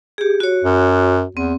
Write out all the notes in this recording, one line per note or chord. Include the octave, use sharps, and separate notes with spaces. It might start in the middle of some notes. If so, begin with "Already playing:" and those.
G4 G#4
F#4 C#5
F#2
E2 C4